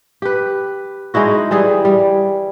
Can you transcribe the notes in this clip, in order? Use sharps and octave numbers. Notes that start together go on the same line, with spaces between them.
G4 B4
G#3 D#4 E4 F#4
E3 G3 E4 G#4
G3